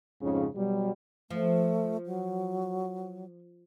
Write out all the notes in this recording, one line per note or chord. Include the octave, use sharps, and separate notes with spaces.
F2 G#2 C#3
B2 F#3 G3
F3 A3
F#3